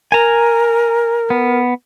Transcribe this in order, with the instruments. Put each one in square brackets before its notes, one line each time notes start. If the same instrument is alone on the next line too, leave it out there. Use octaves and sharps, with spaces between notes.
[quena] A#4 [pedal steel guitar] G#5 A#5
[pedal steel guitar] B3